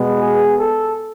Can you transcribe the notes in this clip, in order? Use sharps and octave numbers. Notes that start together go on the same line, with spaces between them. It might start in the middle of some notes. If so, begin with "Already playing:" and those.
Already playing: B2 G#3 B3
G#4
A4